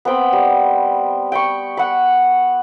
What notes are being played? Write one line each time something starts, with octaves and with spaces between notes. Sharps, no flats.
B3 C4 G5 B5
G3
G5 B5 C#6
F#5 B5